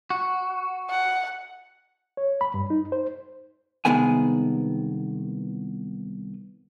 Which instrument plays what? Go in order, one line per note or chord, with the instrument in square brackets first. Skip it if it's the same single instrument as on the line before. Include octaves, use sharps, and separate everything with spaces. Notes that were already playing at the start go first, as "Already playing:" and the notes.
[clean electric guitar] F#4
[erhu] F#5
[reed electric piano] C#5
B5
G2
D#4
C5
[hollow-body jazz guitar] C2 D#3 G#3 B3 G#5